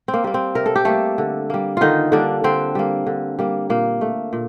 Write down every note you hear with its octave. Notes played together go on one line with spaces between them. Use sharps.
C4
A#3
G3 A#3
C4
C3 A#4
A4
G4
G3 A3 A#3 A4
D3
G3 A#3
D3 D#3 D#4 F4
D3 G3 A#3 D4
D3 C4
G3 A#3
D3
G3 A#3
A#2 A#3
A3
A#2